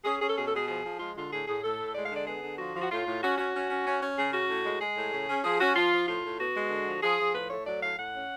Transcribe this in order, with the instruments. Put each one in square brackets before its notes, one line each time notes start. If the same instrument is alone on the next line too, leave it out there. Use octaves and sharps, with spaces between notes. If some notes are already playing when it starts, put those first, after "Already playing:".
[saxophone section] C#4 G#4
C#4 G#4
A4
B2 G#4
A4
B2 G#4
F3 G#4
F3
G#3 F4
D3 F4
A2 G#4
A2 G#4
A2 A4
A2
G#3 D5
F5
D3 D5
B3 G#4
D3
F3 F#4
F3
F#4
A2 F4
A2
C#4 F#4
C#4 F#4
C#4
C#4
C#4
C#4
C#3 G#4
C#4 F#4
A2
G#3
G#3 G#4
A2
C#3
C#4
F3 G#4
C#4 F#4
F3 F4
F3
A2 F4
A2
B3 F#4
G#3
D3
F3
F3 G#4
F3
A2 B4
A3 C#5
F#3 D5
A2 F5
A2 F#5
C#4